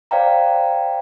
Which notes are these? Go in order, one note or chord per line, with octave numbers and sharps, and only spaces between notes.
C5 D5 F5 G5 A#5